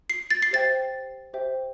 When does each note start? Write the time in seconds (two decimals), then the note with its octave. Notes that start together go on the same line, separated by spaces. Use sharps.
0.10 C7
0.31 A6
0.42 C7
0.51 G4 C5 E5 G5 A6
1.33 G4 C5 E5 G5